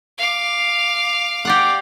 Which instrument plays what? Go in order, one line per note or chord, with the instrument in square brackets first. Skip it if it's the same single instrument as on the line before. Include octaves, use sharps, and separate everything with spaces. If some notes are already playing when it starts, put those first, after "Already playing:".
[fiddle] F5 D6
[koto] G4 D5 F#5